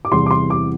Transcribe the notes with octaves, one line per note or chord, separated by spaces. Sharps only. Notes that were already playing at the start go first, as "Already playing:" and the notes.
D6
E2 C3 E3 G3 C6
D6
C6
D6